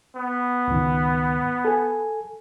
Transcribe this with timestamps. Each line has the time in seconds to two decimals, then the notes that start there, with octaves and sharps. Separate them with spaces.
0.16 B3
0.68 C#2 G#2 D#3
1.65 A4 G#5